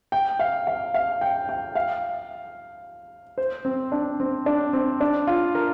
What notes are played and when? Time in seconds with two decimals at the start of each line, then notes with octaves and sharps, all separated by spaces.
0.12 G5
0.39 F5
0.67 F5
0.94 F5
1.21 G5
1.49 G5
1.75 F5
3.38 C5
3.65 C4
3.92 D4
4.20 C4
4.46 D4
4.73 C4
5.01 D4
5.27 F4
5.55 A#4